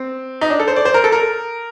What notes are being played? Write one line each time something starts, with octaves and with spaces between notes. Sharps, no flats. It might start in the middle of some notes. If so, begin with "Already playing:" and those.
Already playing: C4
D#4
D4
A4
C5
D5
C5
A#4
A4
A#4